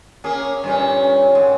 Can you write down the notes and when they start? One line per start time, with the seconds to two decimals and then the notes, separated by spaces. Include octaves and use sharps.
0.24 A#3 C#4 G#4
0.64 G2 A#2 C#4
1.32 G#2 C4